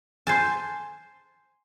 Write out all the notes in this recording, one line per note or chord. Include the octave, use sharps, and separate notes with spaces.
C5 G#5 A5